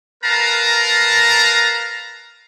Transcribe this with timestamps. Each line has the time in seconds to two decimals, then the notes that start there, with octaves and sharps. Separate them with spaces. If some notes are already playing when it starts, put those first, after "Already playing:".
0.24 A#4 B4 F5 A5 A#5